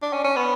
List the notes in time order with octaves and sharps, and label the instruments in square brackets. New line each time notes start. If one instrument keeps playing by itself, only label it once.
[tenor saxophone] D4
C#4
C#4
B3